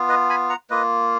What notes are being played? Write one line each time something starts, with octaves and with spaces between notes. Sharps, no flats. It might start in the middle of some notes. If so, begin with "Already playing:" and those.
Already playing: B3 F4
B4 D#5
G#5 B5
F#5 A#5
A#3 F4 B4 D#5